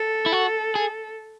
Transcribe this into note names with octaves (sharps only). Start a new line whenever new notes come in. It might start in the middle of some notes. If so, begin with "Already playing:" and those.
Already playing: A4
E4
F#4
G#4